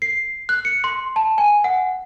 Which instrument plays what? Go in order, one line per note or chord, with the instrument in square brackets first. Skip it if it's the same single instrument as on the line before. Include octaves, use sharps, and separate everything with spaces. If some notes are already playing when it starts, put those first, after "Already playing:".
[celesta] C7
F#6
C#7
C6
A5
G#5
F#5